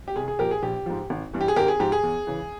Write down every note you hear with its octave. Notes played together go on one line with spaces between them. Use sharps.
G4
C2 G#4
G#4
A#2 F3 G4 A#4
G#4
A#1 G4
G#2 F3
G#1
G2 E3
G4
G#4
G#1 G4 A#4
G#4
G#2 F3 G4
G#4
E2
C#3 E3